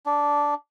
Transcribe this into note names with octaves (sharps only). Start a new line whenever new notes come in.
D4